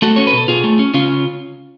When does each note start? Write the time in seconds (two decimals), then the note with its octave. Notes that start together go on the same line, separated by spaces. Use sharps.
0.02 A3 F#4 A4
0.16 C#4 C#5
0.27 B4
0.33 B2 A4
0.48 B2 F4 G#4
0.64 A3
0.79 C#4
0.94 C#3 C#4 F4